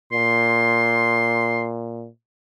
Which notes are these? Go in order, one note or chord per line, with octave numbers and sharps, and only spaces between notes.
A#2 C6